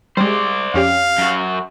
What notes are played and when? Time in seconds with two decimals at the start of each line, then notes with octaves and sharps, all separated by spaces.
0.17 G3 G#3 C5 D5
0.74 F2 C#4 G4 F5
1.18 F#2 F#4